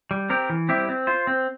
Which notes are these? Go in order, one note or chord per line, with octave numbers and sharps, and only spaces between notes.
G3
C4 G4 A#4
E3
G3 C4 E4 G4
C4
F4 C5
C4